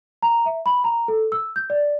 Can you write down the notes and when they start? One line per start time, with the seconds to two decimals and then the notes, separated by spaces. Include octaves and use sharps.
0.23 A#5
0.46 E5
0.66 B5
0.84 A#5
1.08 A4
1.32 E6
1.56 G6
1.70 D5